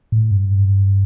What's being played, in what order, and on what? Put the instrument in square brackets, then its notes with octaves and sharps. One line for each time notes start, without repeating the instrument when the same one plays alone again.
[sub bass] A2
G2